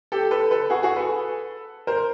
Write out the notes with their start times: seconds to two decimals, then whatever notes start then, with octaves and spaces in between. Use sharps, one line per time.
0.12 G4 A4
0.31 A4 B4
0.51 A4 B4
0.70 F#4 G#4
0.83 F#4 G#4
0.96 A4 B4
1.87 A#4 C5